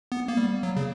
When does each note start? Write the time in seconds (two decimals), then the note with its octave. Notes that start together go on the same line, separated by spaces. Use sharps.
0.12 B3
0.28 A#3
0.37 G3
0.63 F#3
0.77 C#3